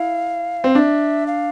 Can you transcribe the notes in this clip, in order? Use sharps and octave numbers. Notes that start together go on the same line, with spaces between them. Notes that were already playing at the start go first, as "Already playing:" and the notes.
Already playing: E4 F5
C4
D4 E5 F5
F5